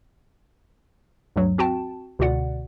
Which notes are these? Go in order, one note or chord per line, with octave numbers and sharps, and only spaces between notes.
D2 G2 F#3
C4 F#4 G5 A5
C#2 B2 D3 F#4 D5 F#5